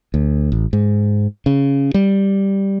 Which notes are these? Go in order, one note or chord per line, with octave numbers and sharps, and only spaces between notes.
D2
A1
G#2
C#3
G3